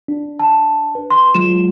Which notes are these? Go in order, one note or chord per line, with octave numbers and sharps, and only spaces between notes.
D4
A5
B4
C6
F#3 G#3 F4 E7